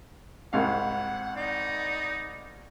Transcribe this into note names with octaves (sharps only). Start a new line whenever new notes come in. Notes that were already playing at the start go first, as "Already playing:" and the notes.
C2 G#2 F5 F#5
D#4 D5